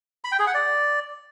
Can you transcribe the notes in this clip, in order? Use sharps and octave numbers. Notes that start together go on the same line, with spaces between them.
B5
G5
G#4
F#5
D5